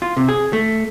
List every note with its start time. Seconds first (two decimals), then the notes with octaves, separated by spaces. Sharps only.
0.02 F4
0.17 C3
0.28 G#4
0.53 A3